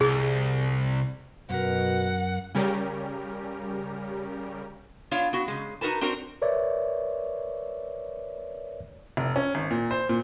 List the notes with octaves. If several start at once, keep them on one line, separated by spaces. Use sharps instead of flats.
C2 G#4
F#2 B2 A#4 F#5
C#3 G3 C#4 G4 A#4
B3 D4 F4 C#5 F5
B3 F#4
C#3 G#3
D#4 F#4 A#4 B4 A5
C4 D4 F#4 A#4 C5
A#4 B4 C#5 D5 E5
F1
C#4
G#1
A#2
C5
A#2